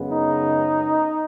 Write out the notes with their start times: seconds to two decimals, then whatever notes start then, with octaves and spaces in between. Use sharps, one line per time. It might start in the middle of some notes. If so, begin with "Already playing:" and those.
Already playing: F#2 C#3 G#3 B3
0.11 D#4